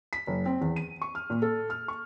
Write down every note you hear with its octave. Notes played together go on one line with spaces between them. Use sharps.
B6
F#1
C4
E2
D#7
C#6
F6
A#2
A4
F6
C#6